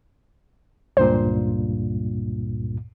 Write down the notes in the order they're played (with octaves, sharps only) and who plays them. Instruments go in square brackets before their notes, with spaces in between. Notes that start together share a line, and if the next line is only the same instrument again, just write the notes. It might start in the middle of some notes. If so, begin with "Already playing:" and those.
[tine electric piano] C#2 G2 A#2 [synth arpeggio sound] C5